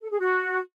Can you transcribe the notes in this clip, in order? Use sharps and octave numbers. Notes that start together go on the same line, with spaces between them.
A4
G#4
F#4